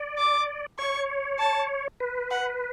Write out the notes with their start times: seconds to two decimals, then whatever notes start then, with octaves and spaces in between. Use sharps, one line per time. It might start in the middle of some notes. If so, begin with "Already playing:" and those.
Already playing: D5
0.19 D6
0.79 C#5 C#6
1.39 A5
2.00 B4
2.31 F#5